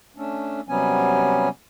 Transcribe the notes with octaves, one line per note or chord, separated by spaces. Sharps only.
A3 C#4 D4
C3 F#3 G3 B3 C#4 G#5